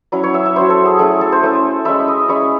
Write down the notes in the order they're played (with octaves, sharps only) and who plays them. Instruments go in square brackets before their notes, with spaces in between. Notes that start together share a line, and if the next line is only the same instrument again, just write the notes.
[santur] F#3 C#4 E4
C#5
E5
E5
F#3 C#4 E4 C5
A4
G#4
A3 C#4 E4 G#4
A4
C5
A3 C#4 E4
G#3 C#4 E4 E5
D#5
G#3 C#4 E4 C#5